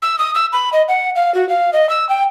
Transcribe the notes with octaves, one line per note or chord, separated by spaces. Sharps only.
E6
D#6
E6
B5
D#5
F#5
F5
F#4
F5
D#5
E6
G5